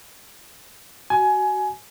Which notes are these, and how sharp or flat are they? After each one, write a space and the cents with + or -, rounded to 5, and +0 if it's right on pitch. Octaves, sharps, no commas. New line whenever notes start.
F#4 +20 G#5 +20